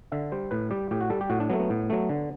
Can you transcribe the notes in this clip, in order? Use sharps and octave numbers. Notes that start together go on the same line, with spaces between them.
D3 E5
G3 C5
A2 B4
G3 G4
A2 G4
F#4
G3 A4
G4
A2 F#4
D4
F#3 A3 B3
B3
A2
F#3 A3
D3